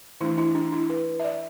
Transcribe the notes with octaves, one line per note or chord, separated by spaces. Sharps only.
E3 A3 D4 E4
E4
D4
E4
B4
E5
D5